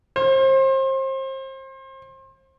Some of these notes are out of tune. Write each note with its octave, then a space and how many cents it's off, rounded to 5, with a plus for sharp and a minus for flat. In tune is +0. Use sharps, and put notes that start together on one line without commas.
C5 +30